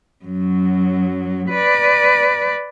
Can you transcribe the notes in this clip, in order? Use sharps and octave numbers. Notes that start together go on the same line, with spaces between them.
F#2 F#3
B4 D5